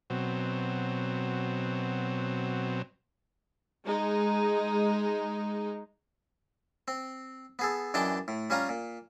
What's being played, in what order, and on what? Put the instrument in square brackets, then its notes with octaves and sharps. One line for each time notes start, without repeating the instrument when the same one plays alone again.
[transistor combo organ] B2 F#3 C4
[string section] G#3 D#4
[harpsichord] C4
B3 G#4 A4
F#2 E3 D4 D#5 G5 A5
A2
G3 C#4 F4 G#5 A#5
A#2